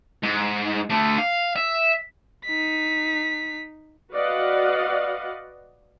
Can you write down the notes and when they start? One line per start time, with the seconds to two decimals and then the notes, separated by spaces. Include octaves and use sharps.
0.23 G#2
0.90 A3 D4
1.18 F5
1.56 E5
2.45 D#4 B6
4.14 F#4 B4 D5 D#5 F5 F#5